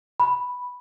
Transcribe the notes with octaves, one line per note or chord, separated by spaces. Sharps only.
B5